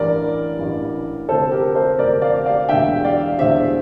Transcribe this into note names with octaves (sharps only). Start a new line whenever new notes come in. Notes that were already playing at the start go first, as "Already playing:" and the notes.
Already playing: A1 G2 E3 A#4 D5
A1 G2 E3
G1 F2 C3 A4 C5
G4 A#4
A4 C5
G1 F2 C3 A#4 D5
D5 F5
D5 F5
E1 E2 D3 E5 G5
D5 F5
E1 E2 D3 C5 E5